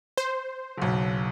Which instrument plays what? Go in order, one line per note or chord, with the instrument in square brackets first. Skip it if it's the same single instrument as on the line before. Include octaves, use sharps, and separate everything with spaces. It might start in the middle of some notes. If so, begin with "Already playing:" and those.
[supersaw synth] C5
[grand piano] F#1 B1